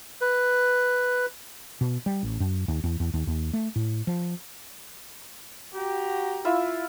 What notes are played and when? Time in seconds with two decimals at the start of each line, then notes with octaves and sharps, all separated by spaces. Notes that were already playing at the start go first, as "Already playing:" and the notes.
0.21 B4
1.81 B2
2.06 G3
2.23 A1
2.40 F#2
2.68 D#2
2.84 E2
3.00 E2
3.14 D#2
3.27 D#2
3.53 A3
3.76 A2
4.07 F3
5.75 F#4 G4 A#5
6.45 E4 F4 E5